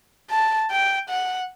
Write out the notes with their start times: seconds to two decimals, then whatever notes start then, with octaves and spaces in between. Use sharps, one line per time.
0.30 A5
0.71 G5
1.10 F#5